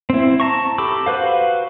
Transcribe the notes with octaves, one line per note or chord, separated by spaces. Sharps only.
C4 E4
A5 A#5 C#6
G4 A4 B5 D6 E6
F#4 B4 C5 F5